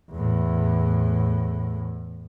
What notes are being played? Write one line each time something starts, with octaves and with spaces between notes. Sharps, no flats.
E2 A2